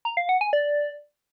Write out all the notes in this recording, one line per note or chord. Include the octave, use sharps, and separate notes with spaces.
A#5
F5
F#5
G#5
D5